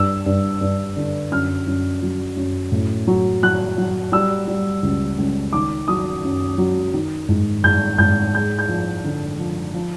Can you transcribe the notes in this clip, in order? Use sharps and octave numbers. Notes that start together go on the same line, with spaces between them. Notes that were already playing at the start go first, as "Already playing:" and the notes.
Already playing: G2 E6
G2
G2
D3
F#2 F6
F#2
F#3
F#2
A2
F#3
F#3 F#6
F#3
G3 E6
G3
C#2
C#2
D#3 D6
F#3 D#6
F#2
F#3
D#3
G#2
G#2 G6
G#2 G6
G#3 G6
G6
F3
D3
F3
F3